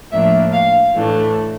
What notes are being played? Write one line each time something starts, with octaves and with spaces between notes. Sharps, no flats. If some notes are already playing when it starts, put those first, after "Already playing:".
A2 F3 A#3 D4 E5
F5
A2 E3 A3 D4